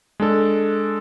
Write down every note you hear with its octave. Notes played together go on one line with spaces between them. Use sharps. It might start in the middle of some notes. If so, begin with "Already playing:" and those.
G#3 D4 A4